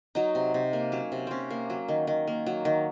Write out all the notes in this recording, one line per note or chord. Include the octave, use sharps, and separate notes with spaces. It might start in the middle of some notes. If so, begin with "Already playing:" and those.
F#3 D#4
C3
C3
A#3
F#3 C#4
C3
C3 C4 C#4
A#3
F#3
D#3
D#3
A#3
F#3
D#3